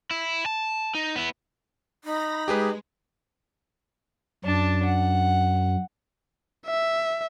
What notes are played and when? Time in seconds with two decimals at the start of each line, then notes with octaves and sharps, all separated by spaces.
0.11 E4
0.46 A5
0.95 D#4
1.16 B3 E4
2.04 D#4 B5 A#6
2.48 G#3 G4 G#4 B4
4.45 F#2 D4 A5
4.85 F#5
6.66 E5